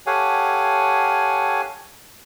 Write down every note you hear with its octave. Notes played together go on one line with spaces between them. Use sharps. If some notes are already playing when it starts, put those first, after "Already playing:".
G4 A4 C#5 F5 F#5 G#5